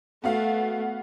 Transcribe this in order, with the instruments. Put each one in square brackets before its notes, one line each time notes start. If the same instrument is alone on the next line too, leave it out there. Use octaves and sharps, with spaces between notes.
[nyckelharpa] A3 [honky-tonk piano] B3 F#4 F5